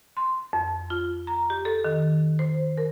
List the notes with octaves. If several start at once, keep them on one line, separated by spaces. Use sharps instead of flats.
C6
F2
F4
A#5
G4
A4
D#3
C5
A#4